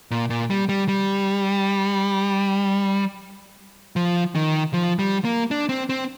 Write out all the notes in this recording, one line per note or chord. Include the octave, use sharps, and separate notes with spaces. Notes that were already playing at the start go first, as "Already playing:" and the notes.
A#2
A#2
G3
G3
G3
F3
D#3
F3
G3
A#3
D4
C4
C4